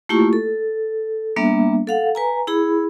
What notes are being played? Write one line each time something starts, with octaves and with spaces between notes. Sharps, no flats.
A3 A#3 E4 F4 G4 C#6
A4
G3 A#3 B3 D4 E5
A4 F5 F#5
B4 G#5 A#5
E4 G#4 B5